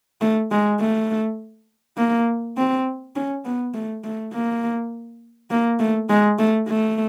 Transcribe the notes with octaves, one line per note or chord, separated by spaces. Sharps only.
A3
G#3
A3
A#3
C4
C#4
B3
A3
A3
A#3
A#3
A3
G#3
A3
A3